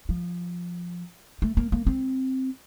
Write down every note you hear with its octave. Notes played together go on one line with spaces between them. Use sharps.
F3
A3
A#3
A#3
C4